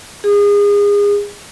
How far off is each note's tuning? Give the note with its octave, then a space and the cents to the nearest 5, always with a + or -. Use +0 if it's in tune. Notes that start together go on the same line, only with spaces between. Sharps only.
G#4 -30